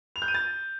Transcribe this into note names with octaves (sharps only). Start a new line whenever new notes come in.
F7
G6
D#7
A6